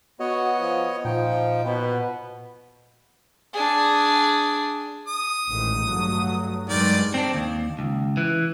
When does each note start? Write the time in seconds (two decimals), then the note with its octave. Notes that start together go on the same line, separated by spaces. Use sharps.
0.20 B3 F#4 C#5 D#5
0.59 F3
1.05 A#2 F3 D#4 G5
1.65 B2 B4
3.54 D4 G#4
5.08 D#6
5.49 A1 G#2 D#3
5.86 G2 F#3 A3
6.69 G2 D#3 F#3 G#3 D5
7.14 C4 D4
7.34 D#2
7.79 C#2
8.17 E3